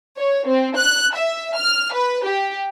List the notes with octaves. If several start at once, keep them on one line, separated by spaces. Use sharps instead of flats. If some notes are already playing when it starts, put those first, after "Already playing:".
C#5
C4
F#6
E5
F6
B4
G4